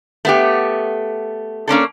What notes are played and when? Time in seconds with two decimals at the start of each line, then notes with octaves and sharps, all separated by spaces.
0.25 A3 B3 G4
1.68 A#3 C#4 D4 A4